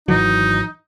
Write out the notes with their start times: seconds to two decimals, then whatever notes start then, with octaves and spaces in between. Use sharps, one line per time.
0.08 G#1 E3 F#3 D#4